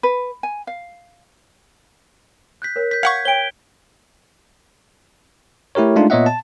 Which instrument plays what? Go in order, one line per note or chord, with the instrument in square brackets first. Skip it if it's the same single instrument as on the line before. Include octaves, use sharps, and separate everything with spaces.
[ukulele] B4
G#5
F5
[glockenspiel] F#6 G6 B6
[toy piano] A#4 C#5
[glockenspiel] G6 B6
[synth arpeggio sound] F5 F#5 C#6 [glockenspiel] G#6
[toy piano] C#5 G5 [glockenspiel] D7 G7
[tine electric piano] A3 E4 G4 A#4 C#5
G#3 A3 D4 D#4 F4
A#2 B3 C#5 D#5 E5 F#5
A5